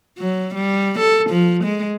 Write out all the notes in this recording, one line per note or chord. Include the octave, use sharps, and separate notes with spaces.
F#3
G3
A4
F3
G#3